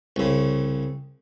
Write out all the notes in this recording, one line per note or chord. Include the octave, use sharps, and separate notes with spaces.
C2 C#3